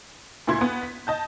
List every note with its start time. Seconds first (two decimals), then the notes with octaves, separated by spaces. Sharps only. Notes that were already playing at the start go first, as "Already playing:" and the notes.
0.47 D2 A#2 E4 C6 G#6
0.61 B3
0.81 B6
1.07 D#5 A5 G6